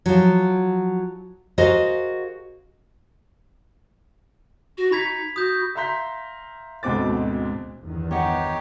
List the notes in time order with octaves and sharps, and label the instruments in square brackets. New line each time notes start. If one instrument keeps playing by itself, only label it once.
[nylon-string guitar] F3 F#3
F#4 G#4 A#4 C5 D#5 F5
[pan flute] F#4
[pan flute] D#4 [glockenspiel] B5 G#6 B6
[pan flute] F#4 [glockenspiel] D#6 G6
[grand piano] E5 F5 A#5 C6 G6 B6
D2 G#2 B2 C4 D6 A6
[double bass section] G1 E2 D#3
[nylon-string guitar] B3 F#5 [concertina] D#4 G4 C#5